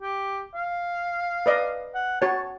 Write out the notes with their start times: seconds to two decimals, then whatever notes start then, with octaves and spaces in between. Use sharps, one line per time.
0.01 G4
0.55 F5
1.46 B4 D5 D#5
1.95 F#5
2.22 F#4 C#5 A5